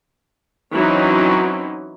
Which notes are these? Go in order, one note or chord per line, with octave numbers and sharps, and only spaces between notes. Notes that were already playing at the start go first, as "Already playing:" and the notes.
E3 F#3 C4 C#4 D#4 F#4